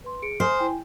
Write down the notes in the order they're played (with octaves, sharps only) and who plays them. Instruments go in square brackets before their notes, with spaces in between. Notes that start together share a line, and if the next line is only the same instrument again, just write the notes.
[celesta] B4 C6
G#4 C#7 D7
[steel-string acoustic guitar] C5 [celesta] G#5 D#6 F6
[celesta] E4 G5 G#5